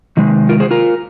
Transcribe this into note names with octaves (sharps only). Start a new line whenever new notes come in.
C3 D#3 G#3
F4 A#4
G#4 C5
F4 A#4